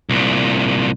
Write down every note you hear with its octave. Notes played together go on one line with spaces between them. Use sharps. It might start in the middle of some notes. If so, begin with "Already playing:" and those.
C2 A#2